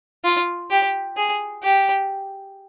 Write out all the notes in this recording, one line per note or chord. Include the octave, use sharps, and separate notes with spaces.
F4
G4
G#4
G4